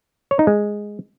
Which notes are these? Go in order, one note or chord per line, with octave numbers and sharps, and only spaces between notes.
C#5
D#4
G#3